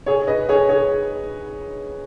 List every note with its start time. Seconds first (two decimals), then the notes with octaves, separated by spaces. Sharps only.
0.06 G#4 C#5
0.27 B4 D#5
0.49 G#4 C#5
0.69 G#4 C#5